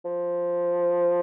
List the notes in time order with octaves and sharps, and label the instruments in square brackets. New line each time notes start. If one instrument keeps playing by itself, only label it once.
[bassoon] F3